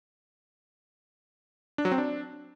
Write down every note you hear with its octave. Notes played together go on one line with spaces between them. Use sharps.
D4
F#3
C4
D4